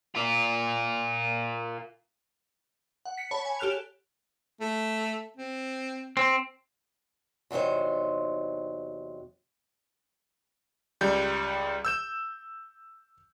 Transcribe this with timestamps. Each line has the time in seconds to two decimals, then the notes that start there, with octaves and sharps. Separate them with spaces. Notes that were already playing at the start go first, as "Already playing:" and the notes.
0.15 F4 A#4
3.05 F#5
3.18 B6 C#7
3.31 C#5 A5 B5
3.45 G#5
3.59 G4 A4 F6 F#6 F7
4.61 A3
5.36 C4
6.17 C4
7.51 E2 C3 F#3 D#4 C5
11.01 C#2 G3 G6
11.85 E6 G6 E7